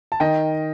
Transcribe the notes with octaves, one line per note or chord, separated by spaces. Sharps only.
A5
D#3 D#5 G5